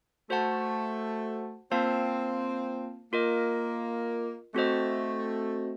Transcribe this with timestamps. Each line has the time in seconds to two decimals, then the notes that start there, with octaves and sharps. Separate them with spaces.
0.29 A3 F#4 C5 F#5 A5
1.71 A#3 C4 F4 C5 F5 A5
3.12 A#3 F4 A#4 D#5
4.54 A3 C4 F#4 C5 D#5